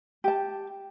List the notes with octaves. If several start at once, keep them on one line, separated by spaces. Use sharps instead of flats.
G4 A5